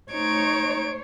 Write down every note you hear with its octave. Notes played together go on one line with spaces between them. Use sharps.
A3 D#4 C5 C#5 G#6 D7